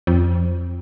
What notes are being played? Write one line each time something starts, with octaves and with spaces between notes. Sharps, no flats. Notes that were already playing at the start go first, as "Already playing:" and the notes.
F2